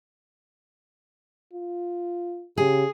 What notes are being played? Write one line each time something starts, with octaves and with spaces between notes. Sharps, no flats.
F4
C#3 G4 G#4